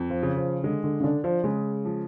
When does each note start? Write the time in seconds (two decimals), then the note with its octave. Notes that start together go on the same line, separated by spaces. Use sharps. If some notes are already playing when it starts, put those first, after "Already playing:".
Already playing: F2
0.10 F3
0.23 C#3
0.37 F3
0.63 D3 G#3
0.84 D3
1.00 C#3
1.04 D3 D4
1.24 F3
1.44 C#3 G#3
1.85 F3